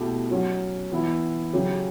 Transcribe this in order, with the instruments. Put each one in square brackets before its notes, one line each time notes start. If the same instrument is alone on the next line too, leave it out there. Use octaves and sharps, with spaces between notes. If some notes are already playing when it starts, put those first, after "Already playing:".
Already playing: [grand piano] B2 A3 E4 G4
F#3 C#4 F#4
E3 B3 E4
C#3 F#3 C#4 G4